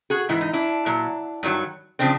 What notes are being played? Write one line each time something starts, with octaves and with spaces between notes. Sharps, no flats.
F#4 G#4
G#2 E3 E4
D#4
D4 E4
A#2 F#3
G2 D#3 F#3
C#3 F3 C4 D4